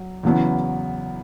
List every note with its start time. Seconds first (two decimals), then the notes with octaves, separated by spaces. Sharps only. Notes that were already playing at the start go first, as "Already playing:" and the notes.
Already playing: F#3
0.23 E2 C#3 F#3 B3 E4